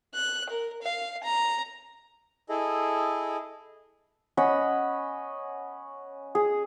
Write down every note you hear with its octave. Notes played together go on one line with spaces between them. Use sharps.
F#6
A#4
F5
A#5
E4 G#4 A4 D#5
C#4 D#5 F#5 B5
G#4